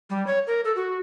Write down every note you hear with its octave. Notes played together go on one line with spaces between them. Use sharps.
G3
C#5
A#4
A4
F#4